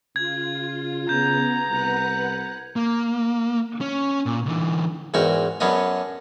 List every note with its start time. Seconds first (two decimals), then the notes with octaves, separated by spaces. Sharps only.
0.16 C#3 F4 G#6
1.09 C#3 B3 A#5 G6
1.68 C2 B4 F#5 F#6
2.76 A#3
3.81 C#4
4.26 A#2
4.46 D3 E3
5.14 E2 G#2 F#4 A#4 G5
5.60 F#2 B3 C#4 D4 D#5